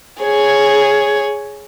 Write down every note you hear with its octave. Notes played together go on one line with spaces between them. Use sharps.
G#4 C#5